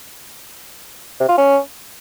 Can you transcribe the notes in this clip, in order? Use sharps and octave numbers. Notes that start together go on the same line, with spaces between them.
C3
F4
C#4